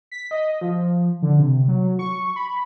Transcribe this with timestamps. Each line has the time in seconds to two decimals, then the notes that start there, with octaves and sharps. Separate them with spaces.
0.11 B6
0.31 D#5
0.61 F3
1.22 D3
1.39 C3
1.68 F#3
1.99 C#6
2.36 B5